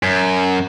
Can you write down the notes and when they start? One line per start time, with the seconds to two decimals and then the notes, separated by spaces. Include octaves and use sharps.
0.03 F#2